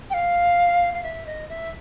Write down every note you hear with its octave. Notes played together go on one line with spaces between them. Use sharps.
G5
F5
F5
E5
D#5
E5